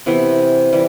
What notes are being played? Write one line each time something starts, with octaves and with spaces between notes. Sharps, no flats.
C3 E3 B3
E3 G3